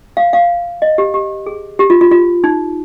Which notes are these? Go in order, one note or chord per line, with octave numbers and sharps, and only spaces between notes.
F5
F5
D#5
G4
G4
G#4
G4
F4
F4
F4
D#4